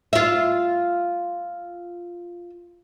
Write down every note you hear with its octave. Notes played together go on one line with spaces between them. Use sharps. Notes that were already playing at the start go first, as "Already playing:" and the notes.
F4 E5